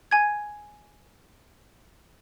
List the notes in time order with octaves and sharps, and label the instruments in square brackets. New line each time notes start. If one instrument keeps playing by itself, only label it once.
[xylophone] G#5 G#6